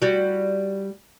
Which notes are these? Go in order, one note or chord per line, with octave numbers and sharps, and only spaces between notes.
G3 F#4